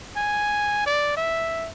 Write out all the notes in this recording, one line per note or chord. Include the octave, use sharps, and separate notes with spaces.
G#5
D5
E5